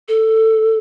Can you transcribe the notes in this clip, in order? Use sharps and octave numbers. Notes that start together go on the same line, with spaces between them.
A4